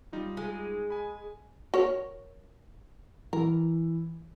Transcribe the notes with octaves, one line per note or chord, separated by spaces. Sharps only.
G3 D#4 F4
G#3
G#5 B5
F#4 A#4 C#5
E3 A#4